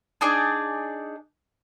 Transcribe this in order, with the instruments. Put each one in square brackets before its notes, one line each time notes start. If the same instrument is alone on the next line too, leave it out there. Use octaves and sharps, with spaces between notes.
[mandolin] D4 D#4 G#4 D5